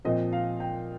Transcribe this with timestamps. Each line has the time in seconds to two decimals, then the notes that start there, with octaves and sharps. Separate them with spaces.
0.05 A#2 F3 C4 D#5
0.33 F5
0.60 G5